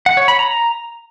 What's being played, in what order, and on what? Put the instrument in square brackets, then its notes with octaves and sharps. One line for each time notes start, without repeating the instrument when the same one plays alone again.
[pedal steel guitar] F#5
C#5
B5
A#5